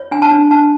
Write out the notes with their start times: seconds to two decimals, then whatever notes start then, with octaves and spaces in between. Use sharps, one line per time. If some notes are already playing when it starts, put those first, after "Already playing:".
Already playing: C#5
0.11 D4 G#5
0.22 A5
0.31 D4
0.51 D4 A5